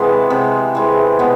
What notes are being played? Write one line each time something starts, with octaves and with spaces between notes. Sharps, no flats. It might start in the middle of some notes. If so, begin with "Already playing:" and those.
Already playing: C3 E3 G#3 B3
C3
E3 G#3
B2 B3